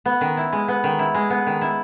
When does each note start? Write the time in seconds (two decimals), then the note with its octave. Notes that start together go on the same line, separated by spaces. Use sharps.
0.06 B3
0.21 D#3
0.37 E4
0.53 G#3
0.68 B3
0.84 D#3
0.99 E4
1.15 G#3
1.30 B3
1.47 D#3
1.61 E4